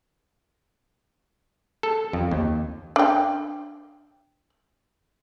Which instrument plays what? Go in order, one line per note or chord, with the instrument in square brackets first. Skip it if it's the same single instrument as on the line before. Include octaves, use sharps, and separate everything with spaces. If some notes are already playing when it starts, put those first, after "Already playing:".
[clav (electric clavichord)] A4
F2
D#2
[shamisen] D4 G5